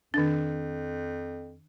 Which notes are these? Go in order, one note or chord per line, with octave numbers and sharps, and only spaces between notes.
F2 D#3 D4